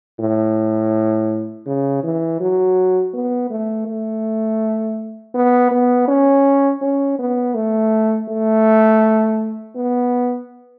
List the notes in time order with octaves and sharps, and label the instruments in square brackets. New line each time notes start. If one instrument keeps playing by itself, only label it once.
[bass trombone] A2
C#3
E3
F#3
B3
A3
A3
B3
B3
C#4
C#4
B3
A3
A3
B3